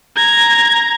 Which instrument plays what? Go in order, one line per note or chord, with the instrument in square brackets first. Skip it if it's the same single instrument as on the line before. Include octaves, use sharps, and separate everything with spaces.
[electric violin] A#5 G#6